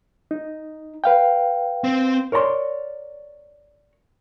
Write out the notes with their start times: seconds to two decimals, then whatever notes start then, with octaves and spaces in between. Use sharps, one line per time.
0.31 D#4
1.04 B4 F5 G5
1.84 C4
2.32 A#4 C#5 D5 A#5 C6